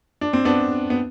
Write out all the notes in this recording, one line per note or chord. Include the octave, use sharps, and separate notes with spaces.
D4
C4
B3 D4
B3